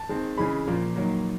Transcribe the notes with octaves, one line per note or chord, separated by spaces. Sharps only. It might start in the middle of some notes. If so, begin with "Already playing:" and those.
Already playing: A5
D#3 G#3 C4
C#3 E3 G#3 B5
A#2 F3 A#3
D#3 F#3 A#3